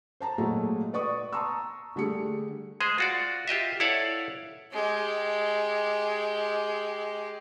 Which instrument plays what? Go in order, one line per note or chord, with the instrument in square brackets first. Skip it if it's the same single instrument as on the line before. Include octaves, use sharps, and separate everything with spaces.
[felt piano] C5 A5 A#5
A#2 F#3 G#3 A3
B4 D5 C#6 D#6
A5 A#5 C6 C#6 D#6 E6
D3 G3 A3 G#4 C#7
[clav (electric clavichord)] G#3 G#4 C5
F4 F#4 D5
F4 G4 D#5 E5
E4 A4 C#5 D5 F5 F#5
[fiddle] G#3 G4